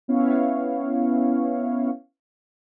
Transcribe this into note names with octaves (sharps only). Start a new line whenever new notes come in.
B3 C#4 E4 C#5 F5